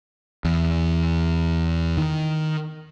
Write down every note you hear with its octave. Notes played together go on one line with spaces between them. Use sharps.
E2
D#3